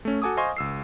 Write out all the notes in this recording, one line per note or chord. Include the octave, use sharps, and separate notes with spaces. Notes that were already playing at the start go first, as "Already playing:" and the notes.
A3 C#4
F#4 A4 G#5 D6 D#6
C5 D#5 F5 G#5 C6 C#6
C#2 E6 C7